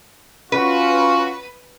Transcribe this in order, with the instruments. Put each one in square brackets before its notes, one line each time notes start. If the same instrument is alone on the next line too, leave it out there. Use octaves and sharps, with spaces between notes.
[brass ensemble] C#4 F4 F#4 [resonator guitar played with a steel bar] B4